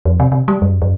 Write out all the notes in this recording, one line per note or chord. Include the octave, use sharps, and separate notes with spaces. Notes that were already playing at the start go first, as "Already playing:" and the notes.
F2
C3
C3
G3
F#2
F#2